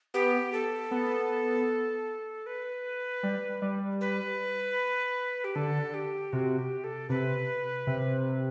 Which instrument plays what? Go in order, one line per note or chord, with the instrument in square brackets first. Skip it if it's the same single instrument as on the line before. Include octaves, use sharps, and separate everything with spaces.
[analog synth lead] B3 [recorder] G4
[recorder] A4
[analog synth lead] B3
[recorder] B4
[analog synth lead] G3
G3
[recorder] B4
G4
[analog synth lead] D3 [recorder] A4
[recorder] G4
[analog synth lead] C3 [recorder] F#4
[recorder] G4
A4
[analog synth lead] C3 [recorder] B4
[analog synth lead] C3